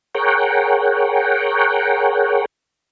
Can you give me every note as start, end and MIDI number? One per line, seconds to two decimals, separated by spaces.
0.15 2.45 68
0.15 2.45 70
0.15 2.45 73
0.15 2.45 78
0.15 2.45 79